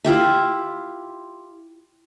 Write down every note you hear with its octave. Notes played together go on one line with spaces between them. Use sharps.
E4 F4 G4 E5